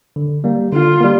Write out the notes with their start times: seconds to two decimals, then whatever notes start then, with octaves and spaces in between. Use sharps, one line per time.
0.16 D3
0.44 G3 A#3
0.73 D3 F4
1.01 G3 A#3